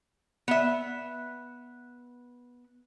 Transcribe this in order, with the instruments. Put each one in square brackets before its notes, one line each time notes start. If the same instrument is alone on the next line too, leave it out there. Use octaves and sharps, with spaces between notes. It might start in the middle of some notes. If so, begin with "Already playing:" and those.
[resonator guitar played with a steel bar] B3 E5